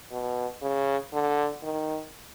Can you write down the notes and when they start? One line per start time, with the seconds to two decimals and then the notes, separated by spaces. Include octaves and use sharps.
0.11 B2
0.62 C#3
1.13 D3
1.63 D#3